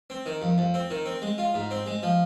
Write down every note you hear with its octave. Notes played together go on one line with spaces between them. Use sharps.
C4
D#3
F2
F2
C4
D#3
C4
G#3
F4
G#2
C4
G#3
F3